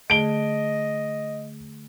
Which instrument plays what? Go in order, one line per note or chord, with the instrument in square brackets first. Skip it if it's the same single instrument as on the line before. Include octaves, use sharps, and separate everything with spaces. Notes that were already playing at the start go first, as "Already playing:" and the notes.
[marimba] D3 A3 G#4 [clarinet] D#5 [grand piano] D7 G7